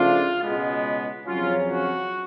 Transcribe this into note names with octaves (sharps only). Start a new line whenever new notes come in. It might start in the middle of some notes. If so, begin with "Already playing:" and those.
Already playing: C#3 F3 A3 D4 F4
C#2 B2 G#3 B3
F2 C#3 F#3 C#4 F4
F#4